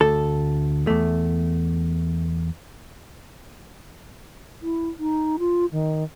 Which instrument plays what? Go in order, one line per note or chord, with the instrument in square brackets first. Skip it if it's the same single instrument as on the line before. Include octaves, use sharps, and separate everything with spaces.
[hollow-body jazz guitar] D2 A4
E2 A3
[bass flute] E4
D#4
F4
D#3